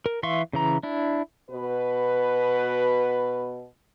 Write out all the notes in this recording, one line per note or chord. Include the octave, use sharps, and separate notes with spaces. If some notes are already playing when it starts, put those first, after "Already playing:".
A#4
E3 E5 F5 C6 C#6
C#3 E3 A#5
D4 E4
B2 B4